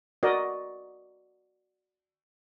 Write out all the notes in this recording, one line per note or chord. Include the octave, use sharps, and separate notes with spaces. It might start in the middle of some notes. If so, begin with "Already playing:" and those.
F#4 A#4 D5 D#5